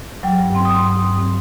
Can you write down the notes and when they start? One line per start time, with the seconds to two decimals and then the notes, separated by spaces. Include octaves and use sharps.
0.23 F#3 G5
0.39 G2
0.55 C4 C6
0.65 D#6
0.71 G2 C6
0.87 F#3 D#6
1.03 G2
1.18 C4